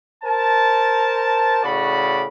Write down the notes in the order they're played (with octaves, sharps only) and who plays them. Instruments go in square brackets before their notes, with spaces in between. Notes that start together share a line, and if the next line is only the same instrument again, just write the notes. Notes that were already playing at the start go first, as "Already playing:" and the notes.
[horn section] A#4 C5 A5
A2 C#3 F#4 D5 B5